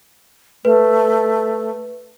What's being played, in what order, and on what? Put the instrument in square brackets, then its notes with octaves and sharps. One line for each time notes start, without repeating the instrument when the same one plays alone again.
[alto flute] A3 [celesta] B4